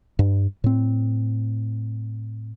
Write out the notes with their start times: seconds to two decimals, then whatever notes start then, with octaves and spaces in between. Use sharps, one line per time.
0.19 G2
0.64 A2 C4